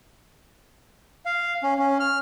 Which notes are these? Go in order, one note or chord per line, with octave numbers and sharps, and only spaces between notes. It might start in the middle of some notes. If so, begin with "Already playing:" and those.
F5
C#4
C#4
F6